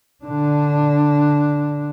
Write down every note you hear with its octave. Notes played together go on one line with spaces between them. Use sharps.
D3 D4